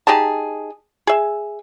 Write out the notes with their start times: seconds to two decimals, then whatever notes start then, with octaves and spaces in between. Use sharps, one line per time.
0.07 D#4 G4 G#4 A5
1.07 G#4 E5